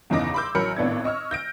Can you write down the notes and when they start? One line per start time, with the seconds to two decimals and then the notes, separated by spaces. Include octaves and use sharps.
0.10 G1 E2 C#3 D#4 D6 A#6
0.34 B5 C6 D6 E6 G6
0.55 A1 F#3 A#4 B5 C#7
0.76 G#1 A2 B3 D4 D5 G#6
1.04 D#5 C#6 E6 F6
1.31 G6 A#6 D7